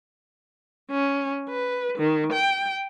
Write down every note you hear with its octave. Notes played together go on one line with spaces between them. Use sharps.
C#4
B4
D#3
G5